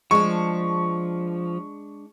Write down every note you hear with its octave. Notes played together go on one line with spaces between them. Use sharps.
F3 G#3 D4 C#6